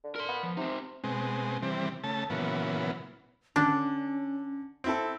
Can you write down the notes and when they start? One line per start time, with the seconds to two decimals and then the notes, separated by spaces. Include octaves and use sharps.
0.04 D3
0.16 A#4 C6
0.29 B3
0.43 F3
0.57 C3 C4 D#4
1.04 B2 G#3 C4
1.62 C3 E3 G3 C4
2.04 C#3 A3 A5
2.30 A#2 C#3 E3 F#3 B3
3.56 D3 C#4 D4
4.84 C4 E4 A4